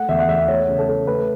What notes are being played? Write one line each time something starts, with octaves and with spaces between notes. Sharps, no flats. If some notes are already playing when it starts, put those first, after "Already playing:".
Already playing: A3 F#5
E2 E5
F#5
E2 E5
A3 C#5
C#3
A4
A3
A3 B4